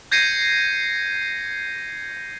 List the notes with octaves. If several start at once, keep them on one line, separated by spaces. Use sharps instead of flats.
G6 G#6 A#6 C7 C#7 D#7